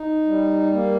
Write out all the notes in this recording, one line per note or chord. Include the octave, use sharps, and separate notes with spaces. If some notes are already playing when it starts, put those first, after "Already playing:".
Already playing: D#4
G3
A#3